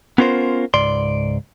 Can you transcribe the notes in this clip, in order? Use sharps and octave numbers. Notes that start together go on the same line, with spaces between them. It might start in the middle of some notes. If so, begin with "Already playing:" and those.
B3 C#4 F4 A#4 C5
C#2 G#2 D5 C6